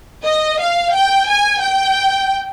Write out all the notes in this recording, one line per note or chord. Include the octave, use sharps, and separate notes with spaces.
D#5
F5
G5
G#5
G5